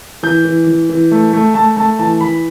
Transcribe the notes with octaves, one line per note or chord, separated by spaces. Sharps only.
E3 G6
E3
E3
E3
A3
A3
A3 A5
A3 A5
E3 A5
E3 B5